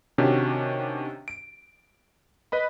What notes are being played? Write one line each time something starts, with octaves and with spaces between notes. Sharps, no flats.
C3 D#3 C#4 D4 F#4 G4
D7
B4 D#5 B5